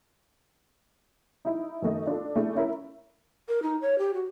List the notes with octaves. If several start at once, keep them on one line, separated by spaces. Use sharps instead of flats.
D#4 E4
F#2 D#3 A3 D#5
D4 F4 A4
A3 D4 E4 G#4
C#4 E4 A#4 E5
A#4
D#4
C#5
G4
F#4